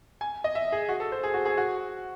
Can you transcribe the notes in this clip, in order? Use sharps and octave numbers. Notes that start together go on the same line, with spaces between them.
G#5
D#5
E5
G#4
F#4
A4
C5
G#4
F#4
G#4
F#4